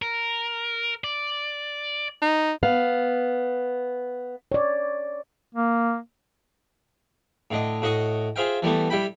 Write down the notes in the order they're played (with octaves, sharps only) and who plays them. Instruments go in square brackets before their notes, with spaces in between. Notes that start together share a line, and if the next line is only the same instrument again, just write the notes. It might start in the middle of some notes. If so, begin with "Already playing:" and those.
[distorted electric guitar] A#4
D5
[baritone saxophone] D#4
[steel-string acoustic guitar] B3 F5
[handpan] C#5 D5
[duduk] A#3
[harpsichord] A2 D3 D#5
A2 F#4 D#5 C#6 D#6
F4 G#4 C5 E5 F5 G5
E3 G3 A3 B3
G3 E4 G5 B5